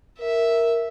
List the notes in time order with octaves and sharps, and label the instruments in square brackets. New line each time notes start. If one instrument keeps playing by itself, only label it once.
[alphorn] A#4 [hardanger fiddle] E5